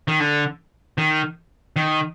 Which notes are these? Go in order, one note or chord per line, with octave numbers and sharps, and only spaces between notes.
D#3
D3
D#3
D#3